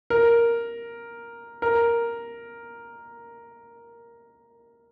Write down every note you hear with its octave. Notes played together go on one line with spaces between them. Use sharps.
A#4
A#4